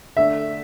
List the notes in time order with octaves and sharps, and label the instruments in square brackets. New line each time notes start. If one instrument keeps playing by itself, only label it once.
[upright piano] D3 A3 D4 E5